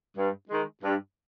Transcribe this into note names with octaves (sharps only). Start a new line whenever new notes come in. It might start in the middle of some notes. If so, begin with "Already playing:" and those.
G2
D#3 G#3
G2